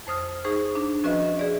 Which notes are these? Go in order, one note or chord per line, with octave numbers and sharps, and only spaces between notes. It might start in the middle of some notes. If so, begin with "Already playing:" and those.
F2 C5 D#6 F6
D#4 G#4 C5 C#6
D4
F3 C#4 F#4 B4 D#5 E5
G#4 D5 E5